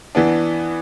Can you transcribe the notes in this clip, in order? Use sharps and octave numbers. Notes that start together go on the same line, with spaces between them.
E3 B3 D4